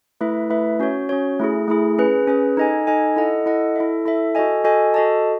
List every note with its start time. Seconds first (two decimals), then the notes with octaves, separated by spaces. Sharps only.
0.21 A3 E4 B4 E5
0.50 A3 E4 B4 E5
0.80 C#4 F#4 C#5
1.09 C#4 F#4 C#5
1.39 A3 E4 G#4
1.68 A3 E4 G#4
1.98 C#4 G#4 B4
2.27 C#4 G#4 B4
2.57 D#4 A4 D#5 G#5
2.87 D#4 A4 D#5 G#5
3.16 E4 A4 D#5 F#5
3.46 E4 A4 D#5 F#5
3.76 E4 A4 E5
4.06 E4 A4 E5
4.35 F#4 A4 D#5 G#5
4.64 F#4 A4 D#5 G#5
4.94 F#4 A4 D#5 A5